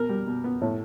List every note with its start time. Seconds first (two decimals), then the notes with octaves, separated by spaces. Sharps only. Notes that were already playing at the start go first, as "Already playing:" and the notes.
Already playing: B2 A#4
0.09 G3
0.27 B2
0.44 B3
0.61 A2